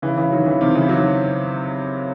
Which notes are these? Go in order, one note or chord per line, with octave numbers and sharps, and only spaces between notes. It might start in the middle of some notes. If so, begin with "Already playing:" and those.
C#3 E3
C#3 E3
D#3 F#3
C#3 E3
C3 D#3
C#3 E3
D#3 F#3